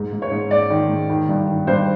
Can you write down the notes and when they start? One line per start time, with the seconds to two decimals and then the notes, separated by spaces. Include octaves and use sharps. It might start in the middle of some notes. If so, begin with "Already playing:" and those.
Already playing: G#2
0.12 G#2
0.22 C#5
0.31 G#2
0.50 G#2 D5
0.70 D#3
0.89 G#2
1.09 D#3
1.29 G2
1.47 D#3
1.67 G2 C5